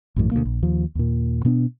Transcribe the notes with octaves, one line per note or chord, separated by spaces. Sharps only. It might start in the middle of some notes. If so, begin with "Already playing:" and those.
A#1 F#2 A2 E3
D2 B2 E3 A#3
A#1
D#2 F3
D#2 A#2
B2 B3 D4